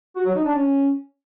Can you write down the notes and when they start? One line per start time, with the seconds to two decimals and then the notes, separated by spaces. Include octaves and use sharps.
0.16 F#4
0.25 F#3
0.35 D#4
0.45 D4
0.54 C#4